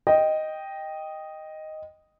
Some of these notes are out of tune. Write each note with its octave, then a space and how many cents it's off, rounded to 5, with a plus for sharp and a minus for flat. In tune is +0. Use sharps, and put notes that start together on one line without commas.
D#5 +0 G5 +0